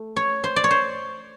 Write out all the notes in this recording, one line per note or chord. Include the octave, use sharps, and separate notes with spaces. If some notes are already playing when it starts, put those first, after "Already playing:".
Already playing: A3
C#5
C5
D5
C#5
C5